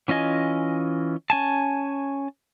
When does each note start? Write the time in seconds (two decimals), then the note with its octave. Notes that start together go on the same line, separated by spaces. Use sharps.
0.08 E3 C#4 F4 D#5 G#5
1.30 C#4 G#5 A5